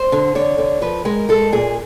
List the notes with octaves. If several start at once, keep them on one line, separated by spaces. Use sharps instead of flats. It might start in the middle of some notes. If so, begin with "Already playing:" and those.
Already playing: C5
D3
D3 C#5
D3
F3 B4
G#3 A#4
G#3 A4
A#2 G#4